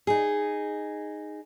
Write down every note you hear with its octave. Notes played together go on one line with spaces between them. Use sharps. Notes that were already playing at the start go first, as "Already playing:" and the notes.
D#4 G#4